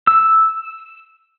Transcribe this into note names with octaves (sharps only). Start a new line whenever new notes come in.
E6